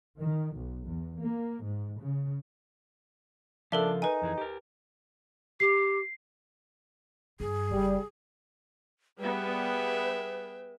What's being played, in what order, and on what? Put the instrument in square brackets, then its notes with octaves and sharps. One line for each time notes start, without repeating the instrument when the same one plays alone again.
[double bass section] D#3
B1
E2
A#3
G#2
C#3
[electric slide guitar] C#3 F3 F5 [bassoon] D4 [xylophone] A4 A#4 E5
[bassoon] D#4 [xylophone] B4 G#5
[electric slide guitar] F2 E3 G#4
G4 A#4
[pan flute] G4 [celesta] C7
[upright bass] G2 [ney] G#4
[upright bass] F#1 [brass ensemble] G3
[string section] G3 B3 [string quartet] G#4 E5 G5 [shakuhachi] B4